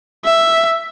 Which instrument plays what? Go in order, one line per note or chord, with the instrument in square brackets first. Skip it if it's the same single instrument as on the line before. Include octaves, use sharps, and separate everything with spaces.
[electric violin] E5